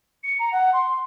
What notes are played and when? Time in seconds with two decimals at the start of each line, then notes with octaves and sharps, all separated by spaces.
0.24 C#7
0.39 A#5
0.52 F#5
0.73 C6